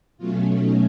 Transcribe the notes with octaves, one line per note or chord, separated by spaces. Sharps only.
B2 F#3 A3 C#4 F4
D#4